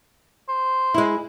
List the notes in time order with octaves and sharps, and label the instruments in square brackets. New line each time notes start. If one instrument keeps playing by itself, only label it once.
[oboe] C5
[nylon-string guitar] G#3 E4